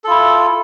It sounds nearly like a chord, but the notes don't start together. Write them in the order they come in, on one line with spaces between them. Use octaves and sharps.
A4 F4 E4